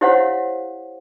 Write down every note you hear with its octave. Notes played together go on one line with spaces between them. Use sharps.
E4 G4 C5 C#5 F5 F#5